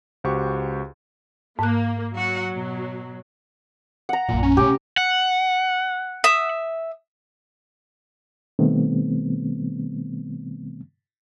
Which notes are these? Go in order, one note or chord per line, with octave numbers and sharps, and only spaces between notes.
C#2 F#4 G4 C5 C#6
G#2 A#3 F#6
F#3 F#4 F#5
B2
F#5 A#5
A#1 F#2 A#2
C#4
C3 A3 G4
F#5
E5 D#6
B2 D#3 G3 A3 B3 C4